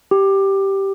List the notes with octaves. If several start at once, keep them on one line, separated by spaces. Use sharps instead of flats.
G4